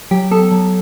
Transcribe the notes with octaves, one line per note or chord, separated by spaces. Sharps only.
F#3 G4 G5
B3 A4 A5
F#3